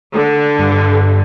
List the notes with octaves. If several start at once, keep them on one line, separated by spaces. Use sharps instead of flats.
D3
G2